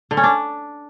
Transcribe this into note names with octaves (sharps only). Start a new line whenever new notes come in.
D3
C#4
D4